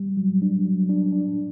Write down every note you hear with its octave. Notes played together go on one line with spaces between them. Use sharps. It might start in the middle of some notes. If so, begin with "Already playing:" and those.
Already playing: G3
F#3
D4
F#3
D4
D4